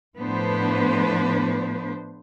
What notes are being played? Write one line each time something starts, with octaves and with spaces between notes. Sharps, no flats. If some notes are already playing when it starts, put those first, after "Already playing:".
A2 F3 B3 D4 B4 C5